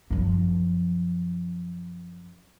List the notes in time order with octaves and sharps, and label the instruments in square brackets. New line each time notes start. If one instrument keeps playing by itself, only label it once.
[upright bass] F#2 F3